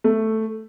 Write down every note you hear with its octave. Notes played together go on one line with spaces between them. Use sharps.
A3